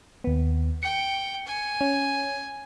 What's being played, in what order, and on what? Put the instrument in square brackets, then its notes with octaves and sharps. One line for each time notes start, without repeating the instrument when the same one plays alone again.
[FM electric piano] D#2 B3
[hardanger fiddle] G5 [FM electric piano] C#7
[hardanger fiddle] G#5
[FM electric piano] C#4